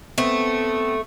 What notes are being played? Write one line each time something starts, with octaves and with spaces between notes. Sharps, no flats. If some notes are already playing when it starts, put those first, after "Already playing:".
A3 B3 C4